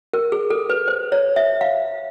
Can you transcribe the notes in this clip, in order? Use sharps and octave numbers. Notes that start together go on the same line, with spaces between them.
A#4
G#4
A4
B4
C5
C#5
E5
F5